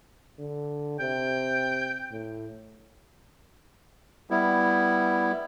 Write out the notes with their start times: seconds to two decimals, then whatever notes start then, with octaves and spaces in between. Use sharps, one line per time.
0.39 D3
1.00 C3 G5
2.12 A2
4.30 G3 B3 E4